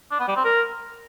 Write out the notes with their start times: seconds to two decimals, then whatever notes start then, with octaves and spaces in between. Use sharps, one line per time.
0.11 D4
0.20 B3
0.28 G3
0.36 C4
0.44 A#4